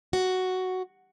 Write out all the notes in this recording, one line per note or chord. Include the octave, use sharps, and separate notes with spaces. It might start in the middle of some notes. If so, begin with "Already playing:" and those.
F#4